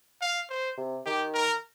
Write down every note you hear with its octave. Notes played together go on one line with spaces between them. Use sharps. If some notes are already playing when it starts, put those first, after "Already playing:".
F5
C5
C3
D#3 G4
A#4